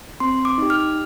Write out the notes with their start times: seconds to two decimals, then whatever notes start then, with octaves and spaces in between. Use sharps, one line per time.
0.20 C4 C6
0.45 D6
0.58 D#4 G4
0.70 F6